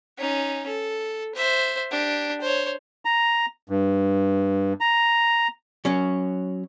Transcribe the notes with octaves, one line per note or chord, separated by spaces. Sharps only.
C#4 D#4
A4
C5 E5
D4 G4
C5 C#5
A#5
G2
A#5
F#3 C#4